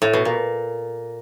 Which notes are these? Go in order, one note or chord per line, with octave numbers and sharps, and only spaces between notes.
A2
B2
A#2